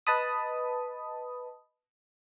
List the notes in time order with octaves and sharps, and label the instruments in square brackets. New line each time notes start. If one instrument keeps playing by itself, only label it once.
[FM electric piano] B4 D#5 A5 B5 D#6